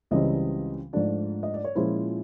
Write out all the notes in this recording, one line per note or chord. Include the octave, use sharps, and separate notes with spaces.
C#2 C#3 E3 G3 C4 D#5
G#2 F3 A3 D4 D5
D#5
D5
C#5
A#2 F3 G#3 C#4 E4 C5